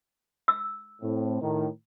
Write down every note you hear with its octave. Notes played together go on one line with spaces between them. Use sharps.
E6
A2 C4
A2 D#3